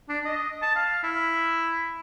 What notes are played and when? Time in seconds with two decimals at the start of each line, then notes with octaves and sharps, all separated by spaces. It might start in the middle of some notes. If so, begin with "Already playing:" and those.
0.09 D4
0.25 D#5
0.62 A5
0.76 F5
1.03 E4